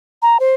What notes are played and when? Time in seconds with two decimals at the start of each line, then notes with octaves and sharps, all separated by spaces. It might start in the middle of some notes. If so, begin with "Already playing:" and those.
0.22 A#5
0.40 C5